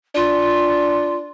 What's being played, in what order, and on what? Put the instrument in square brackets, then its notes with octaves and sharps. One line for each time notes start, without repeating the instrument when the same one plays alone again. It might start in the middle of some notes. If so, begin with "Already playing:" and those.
[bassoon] D4 [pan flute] F4